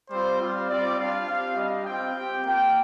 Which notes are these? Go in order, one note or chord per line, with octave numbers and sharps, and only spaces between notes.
G3 C4 F4 C5
G3 C4 F4
G3 C4 F4 D5
G3 D4 F4 F5
C4 G4 F5
G3 D4 G4 D#5
C4 F4 G5
C4 G4
A#3 F4 G5